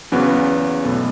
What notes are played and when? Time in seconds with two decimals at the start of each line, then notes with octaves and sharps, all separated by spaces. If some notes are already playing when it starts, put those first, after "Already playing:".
0.12 E2 C#3 F#3 B3
0.84 B1 B2 A3